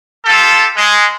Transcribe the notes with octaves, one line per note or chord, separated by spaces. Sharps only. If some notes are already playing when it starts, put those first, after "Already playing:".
F4 G4 A4
G#3